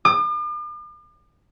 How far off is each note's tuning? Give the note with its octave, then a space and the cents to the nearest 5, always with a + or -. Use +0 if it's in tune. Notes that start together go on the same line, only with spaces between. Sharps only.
D6 +45